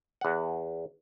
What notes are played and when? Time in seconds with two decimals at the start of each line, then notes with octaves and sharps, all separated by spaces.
0.21 E2 F#5